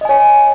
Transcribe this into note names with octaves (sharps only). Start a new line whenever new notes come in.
C#5 D#5 G#5